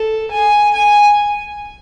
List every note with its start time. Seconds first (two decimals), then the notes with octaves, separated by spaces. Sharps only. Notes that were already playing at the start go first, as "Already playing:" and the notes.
Already playing: A4
0.31 G#5
0.73 G#5